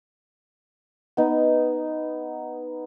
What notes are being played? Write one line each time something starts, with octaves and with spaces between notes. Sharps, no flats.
B3 D#4